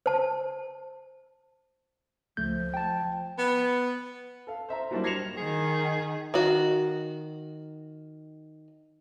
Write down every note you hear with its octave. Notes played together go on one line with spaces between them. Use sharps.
C5 A5
C#2 F3 A3 G6
G5 A5
B3
A4 F5
C5 E5 A#5
F#3 G3 A#3 D4 E4 C5
G#6 A#6 C7 C#7 E7 F7
D#3 G#4
D#3 F#4